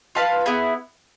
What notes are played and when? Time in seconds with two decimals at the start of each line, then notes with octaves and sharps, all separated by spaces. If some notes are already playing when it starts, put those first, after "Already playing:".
0.15 F4 B4 F5 A5
0.46 B3 E4 G#4